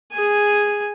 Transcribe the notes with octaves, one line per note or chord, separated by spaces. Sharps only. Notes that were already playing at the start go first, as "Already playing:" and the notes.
G#4 G#5